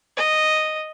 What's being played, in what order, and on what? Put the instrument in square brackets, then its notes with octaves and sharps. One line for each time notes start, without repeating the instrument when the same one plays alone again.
[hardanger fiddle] D#5